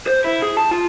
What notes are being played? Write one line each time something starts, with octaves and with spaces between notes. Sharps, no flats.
C5
E4
G#4
A5
F4